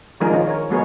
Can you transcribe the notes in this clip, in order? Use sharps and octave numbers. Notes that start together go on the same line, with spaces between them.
D#3 F3 G#3 D4 G#4 A#4
D#3 C#4 D#4 F4
A#4 C#5
F#3 G#3 B3 G#4 A#4 C#5